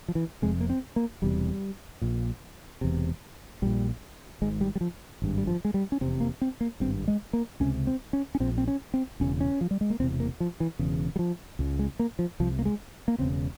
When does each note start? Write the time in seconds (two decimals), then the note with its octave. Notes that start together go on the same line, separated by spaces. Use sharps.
0.08 F3
0.15 E3
0.42 F1 F2 C3 G#3
0.61 A#3
0.70 C4
0.96 A#3
1.22 E1 E2 C3 G3
2.02 A#1 A#2
2.81 E1 E2 C3
3.62 A#1 A#2 G3
4.42 G#1 G#2 G#3
4.61 G3
4.75 G3
4.81 F3
5.22 G#1 G2
5.38 G3
5.47 F3
5.65 G#3
5.74 G3
5.92 C#4
6.01 F1 E2 C3 C4
6.20 A#3
6.41 C4
6.61 A#3
6.80 G#1 G2 C4
7.08 G#3
7.33 A#3
7.60 C#2 C3 C#4
7.87 C4
8.13 C#4
8.35 C#4
8.40 A#1 A#2 C4
8.58 C4
8.68 C#4
8.94 C4
9.20 E1 E2 C#3 C#4
9.40 C#4
9.61 F3
9.71 G3
9.81 G#3
9.90 A#3
10.00 E1 E2 C3 C4
10.20 A#3
10.40 F3
10.60 E3
10.79 E1 E2 C#3
11.16 G3
11.19 F3
11.59 C#2 C#3
11.79 G#3
11.99 A#3
12.19 F3
12.40 C2 C3 F3
12.59 A#3
12.65 G#3
13.08 A#3
13.18 E1 E2 C#3 C4